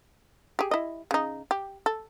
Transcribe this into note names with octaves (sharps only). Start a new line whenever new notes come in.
G4 G#4
E4 D#5
C#3 D#4
G4
A4